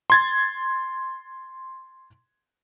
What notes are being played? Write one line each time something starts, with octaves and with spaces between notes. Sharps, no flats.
C6 G#6 A6